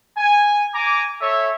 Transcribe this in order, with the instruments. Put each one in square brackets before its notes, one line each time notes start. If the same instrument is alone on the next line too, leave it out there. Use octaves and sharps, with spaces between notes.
[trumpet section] G#5
G#5 A#5 D6
A4 C#5 E5